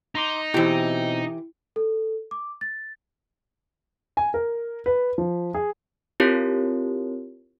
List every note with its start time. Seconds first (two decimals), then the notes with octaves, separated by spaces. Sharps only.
0.15 D#4 A#5 C6 D6
0.54 B2 E3 C4 E4 G4
1.76 A4
2.31 D6
2.61 A6
4.17 G#5
4.34 A#4
4.86 B4
5.18 F3
5.54 G#4
6.20 C4 E4 F4 G4 A#4 C#5